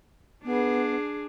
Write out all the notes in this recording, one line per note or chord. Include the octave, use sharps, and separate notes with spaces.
B3 D4 G#4